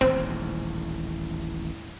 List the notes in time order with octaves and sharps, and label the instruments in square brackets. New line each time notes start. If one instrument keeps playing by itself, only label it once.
[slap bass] D#1 A1 G#2 [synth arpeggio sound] C4